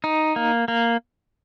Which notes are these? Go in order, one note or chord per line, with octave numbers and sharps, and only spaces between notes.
D#4
A#3
A#3